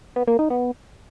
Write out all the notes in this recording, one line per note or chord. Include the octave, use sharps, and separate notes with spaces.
B3
A#3
D#4
B3